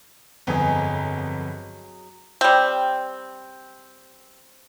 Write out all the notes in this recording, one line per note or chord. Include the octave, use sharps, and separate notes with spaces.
G1 F2 F#3 B3 G#4 D#5
G3 C4